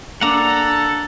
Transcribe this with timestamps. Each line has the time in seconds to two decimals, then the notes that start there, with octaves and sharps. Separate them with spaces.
0.21 A#3 D4 A4 F#5 A#5